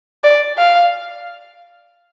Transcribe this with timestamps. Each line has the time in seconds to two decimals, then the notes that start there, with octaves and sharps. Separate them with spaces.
0.24 D5
0.58 F5